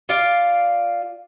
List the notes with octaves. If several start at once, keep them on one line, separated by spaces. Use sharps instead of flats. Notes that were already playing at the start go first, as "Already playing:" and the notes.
F4 D5 F5